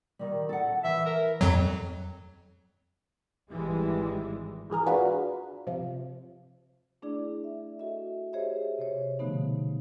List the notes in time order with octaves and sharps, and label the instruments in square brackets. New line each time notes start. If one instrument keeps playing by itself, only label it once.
[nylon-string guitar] D#3 G3
A4 F#5
[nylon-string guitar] E3 [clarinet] E5
[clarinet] A#4
[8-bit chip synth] F2 F#3
[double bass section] G#1 E3 G3 G#3
[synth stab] G#2 E3 G#4 A#4
D4 F4 F#4 G#4 B4
C3 F3
[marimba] A3 D4 E4 G#4 D5
D5 E5
F#4 A4 D#5 E5
G4 G#4 C5 C#5 D#5 E5
C3 C5 C#5
B2 D3 F3 A3 B3 D#4